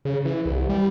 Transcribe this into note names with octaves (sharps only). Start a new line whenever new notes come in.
C#3
E3
C2
G3